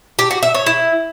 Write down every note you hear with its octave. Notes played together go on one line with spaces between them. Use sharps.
G4
F#4
E5
C#5
E4